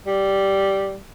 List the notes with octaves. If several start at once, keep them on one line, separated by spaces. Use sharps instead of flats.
G3